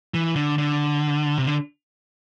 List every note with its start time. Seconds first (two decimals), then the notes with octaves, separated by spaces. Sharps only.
0.14 E3
0.36 D3
0.58 D3
1.38 C3
1.46 D3